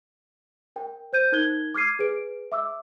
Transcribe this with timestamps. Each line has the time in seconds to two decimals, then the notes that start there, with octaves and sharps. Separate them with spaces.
0.76 A#4 G5
1.13 C5 G6 D#7
1.32 D#4 A#4 F#6 G#6 G7
1.74 D6 F6 G#6 C7 D#7
1.99 G#4 B4 D7
2.52 E5 D6 E6